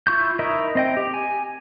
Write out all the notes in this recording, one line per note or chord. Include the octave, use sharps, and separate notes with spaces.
E4 F4 C#6 G6
D#4 E4 A#4 D#5 E5
C4 D#5 G5
G4
G#5